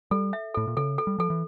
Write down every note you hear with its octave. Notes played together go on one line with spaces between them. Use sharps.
G3 A4
E5
A2 A4
A#2
C#3 A4
A4
G3
F3 A4
E3